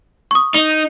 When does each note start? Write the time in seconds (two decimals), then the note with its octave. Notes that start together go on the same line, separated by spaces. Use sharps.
0.31 C#6 D#6
0.54 D#4